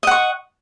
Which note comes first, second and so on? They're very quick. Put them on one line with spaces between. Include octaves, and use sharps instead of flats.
D#5 F#5 C#6